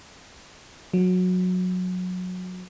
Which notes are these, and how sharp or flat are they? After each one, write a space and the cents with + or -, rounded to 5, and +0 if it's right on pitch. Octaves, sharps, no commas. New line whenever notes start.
F#3 -20